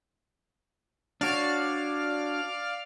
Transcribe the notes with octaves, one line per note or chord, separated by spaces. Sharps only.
D4 F#4 C#5 D5 F5 F6